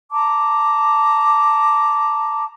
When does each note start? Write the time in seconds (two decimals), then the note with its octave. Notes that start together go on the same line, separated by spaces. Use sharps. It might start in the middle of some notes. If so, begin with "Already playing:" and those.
0.10 A5 A#5 D6